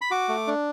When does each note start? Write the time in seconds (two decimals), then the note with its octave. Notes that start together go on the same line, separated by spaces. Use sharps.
0.02 B5
0.11 F#4 D6
0.29 A3
0.47 D4